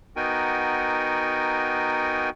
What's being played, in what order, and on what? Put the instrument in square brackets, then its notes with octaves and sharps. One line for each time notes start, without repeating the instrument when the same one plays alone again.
[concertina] B3 D#4 F#4 A#4 G5 G#5